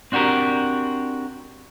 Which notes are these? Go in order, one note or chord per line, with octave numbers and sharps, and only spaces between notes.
C4 D4 F#4 G4 A#4